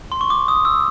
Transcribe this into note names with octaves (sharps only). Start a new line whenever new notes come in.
C6
C#6
D6
D#6
E6